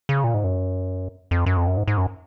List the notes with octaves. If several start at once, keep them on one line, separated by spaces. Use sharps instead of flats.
C#3
A#2
G#2
F#2
F2
F#2
F2
F#2
G#2
G#2
F#2